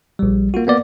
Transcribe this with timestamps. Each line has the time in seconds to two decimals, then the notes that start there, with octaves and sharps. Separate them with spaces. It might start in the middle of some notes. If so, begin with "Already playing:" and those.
0.19 A#1 G3
0.54 A#3 F4 F#4
0.67 A#3 B3 D5